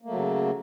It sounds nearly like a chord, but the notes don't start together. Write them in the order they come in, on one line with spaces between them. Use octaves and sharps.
A#3 A3 F#3 C#3